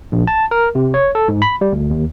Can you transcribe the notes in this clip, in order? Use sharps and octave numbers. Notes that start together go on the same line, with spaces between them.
A#1
A5
A#4
C3
C#5
A4
G#2
B5
G3
D2
D#2